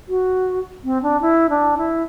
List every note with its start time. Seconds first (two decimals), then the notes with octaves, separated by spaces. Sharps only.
0.08 F#4
0.84 C4
1.03 D4
1.21 E4
1.50 D4
1.77 E4